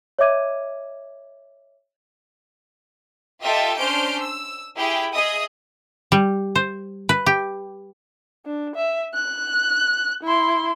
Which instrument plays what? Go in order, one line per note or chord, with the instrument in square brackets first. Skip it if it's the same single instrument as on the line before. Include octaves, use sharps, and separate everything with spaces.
[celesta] C#5 D#5 E5 D6 G#6 D#7
[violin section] F4 G4 A4 D#5 E5 G5
C#4 D4 C5 F6 G6 D7
E6
E4 G4 G#4 G5
G#4 D#5 E5 D#6
[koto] G3
C5
B4
G4
[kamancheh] D4
E5
F#6
E4 C6